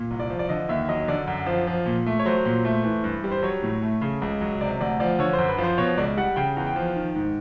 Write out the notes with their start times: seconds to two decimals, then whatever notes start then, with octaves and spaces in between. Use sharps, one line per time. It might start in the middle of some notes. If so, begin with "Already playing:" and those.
Already playing: A#2
0.11 C2
0.20 D5
0.30 F3
0.39 D5
0.49 D3 D#5
0.69 D#2 E5
0.88 F#3 D#5
1.08 D3 D5
1.27 F#2
1.47 F3
1.67 F3
1.86 A#2
2.06 A3
2.19 C#5
2.26 F#3 C5
2.45 A#2
2.65 A3
2.84 E3
3.04 G2
3.24 G3
3.32 C5
3.42 F#3 C#5
3.63 A2
3.82 A3
4.01 C#3
4.22 C#2
4.41 F#3
4.61 C3 D5
4.81 D2 D5
5.00 F3 D5
5.19 D3 C#5
5.33 C5
5.38 F#2
5.48 B4
5.58 F3
5.63 C5
5.78 B2 C#5
5.97 C#2 D5
6.17 G3 F#5
6.36 C#3 G5
6.56 E2
6.66 G5
6.76 F3
6.96 D#3
7.15 G#2